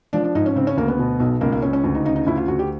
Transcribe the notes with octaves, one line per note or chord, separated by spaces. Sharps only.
F3 D4
D4
G#2 D#4
C#4
C#3 C4
C#4
D2 A#3
B3
B2
B1
C#2 A#3
A#3
C#2 C#4
C#4
D2
D#4
C#3 D#4
D#4
D2 E4
F4
D2 F#4
G4